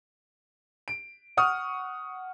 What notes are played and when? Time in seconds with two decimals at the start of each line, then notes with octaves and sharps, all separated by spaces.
0.88 D7
1.37 F#5 C#6 D#6 F6